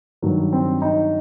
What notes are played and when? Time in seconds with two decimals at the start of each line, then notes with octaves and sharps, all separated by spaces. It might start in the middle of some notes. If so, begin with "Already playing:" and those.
0.22 G2 D#3 F#3
0.53 C4
0.82 D#4